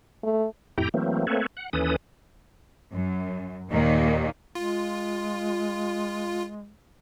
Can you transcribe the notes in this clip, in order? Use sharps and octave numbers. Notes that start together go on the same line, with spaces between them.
A3
F2 A2 E4 G4 G5 A#5
E3 F#3 A3 A#3 C4
A3 A#3 C4 A4 B4 C#5
F#5
D#2 E3 C#4 A4 B4 D#6
F#2
D#2 A#2 D#3 A#3
G#3 F4